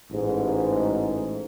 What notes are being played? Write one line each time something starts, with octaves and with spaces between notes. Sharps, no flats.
A1 G#2